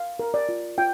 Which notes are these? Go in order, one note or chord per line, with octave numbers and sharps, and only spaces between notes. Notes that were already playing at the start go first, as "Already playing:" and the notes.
Already playing: F5
A#4
D5
F4
F4 G5